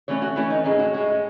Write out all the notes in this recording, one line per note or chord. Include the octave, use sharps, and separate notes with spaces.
E3 A3 C#4 C#5
F#4
E3 A3 C#4 E4
D#4
A2 G#3 C#4 D#4
F#4
A2 G#3 C#4